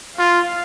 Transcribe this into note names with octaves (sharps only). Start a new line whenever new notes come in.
F4 F5